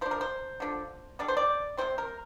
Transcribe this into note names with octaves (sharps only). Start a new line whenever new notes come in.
F3 D4 C5
A#4
C5
D3 F3 D4
D3 G3 D4 D5
C5
D5
C3 G3 C4 C5
A#4